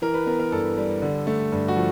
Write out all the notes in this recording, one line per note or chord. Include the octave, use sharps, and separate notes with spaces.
E3 A#4
B4
B3 A#4
A#4
G2 A4
G3
D3
A3
G2
F#4
F3